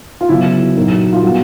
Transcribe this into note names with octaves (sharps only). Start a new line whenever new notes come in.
F4
C#3 F#3 B3 E4
A#2 F#3 A#3 D#4
F4
G3 B3 E4 F#4